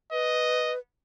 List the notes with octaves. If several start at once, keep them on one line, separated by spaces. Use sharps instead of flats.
B4 D#5